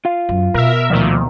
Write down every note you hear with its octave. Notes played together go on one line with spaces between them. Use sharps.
F4 F5
F#2
B2 A#4 E5
D2 A#2 D#3 F3